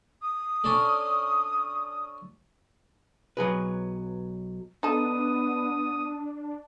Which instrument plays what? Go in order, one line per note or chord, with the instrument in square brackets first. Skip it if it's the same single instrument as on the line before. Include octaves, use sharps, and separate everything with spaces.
[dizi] D#6
[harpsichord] C#4 D4 A4
[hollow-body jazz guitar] B1 F#3 G#4 B4
[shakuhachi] B3 [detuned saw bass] D4 [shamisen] D#4 A4 [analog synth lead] D#6